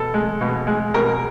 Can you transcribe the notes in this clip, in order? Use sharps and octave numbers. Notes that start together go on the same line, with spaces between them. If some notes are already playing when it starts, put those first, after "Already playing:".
Already playing: B2 A4
G#3
B2
G#3
B2 A#4